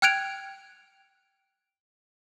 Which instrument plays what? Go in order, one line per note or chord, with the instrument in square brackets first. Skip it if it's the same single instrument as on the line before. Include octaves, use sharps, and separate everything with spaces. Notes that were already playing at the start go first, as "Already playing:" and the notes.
[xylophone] G5 F6 F#6 G#6 D7 F7